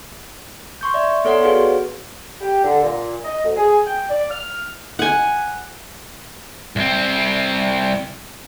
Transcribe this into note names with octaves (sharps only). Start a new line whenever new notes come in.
C6 C#6 G6
D5 E5
B3 A4 C#5 D5 F#5 C6
F#4 G#4 B4 C#5 F5
G4
D3
A#2
D#5
D2
G#4
G5
D5
F6
F#5 G#5
C2 C4